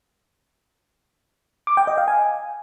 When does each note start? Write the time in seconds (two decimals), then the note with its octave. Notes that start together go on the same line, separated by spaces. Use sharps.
1.67 D6
1.77 G5
1.87 D#5
1.98 F5
2.08 G#5